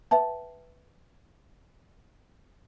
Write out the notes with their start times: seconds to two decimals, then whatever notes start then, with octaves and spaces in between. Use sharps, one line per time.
0.11 B4 E5 G5 A5